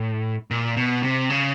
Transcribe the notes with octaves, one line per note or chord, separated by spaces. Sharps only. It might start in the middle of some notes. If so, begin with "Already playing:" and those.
Already playing: A2
A#2
B2
C3
C#3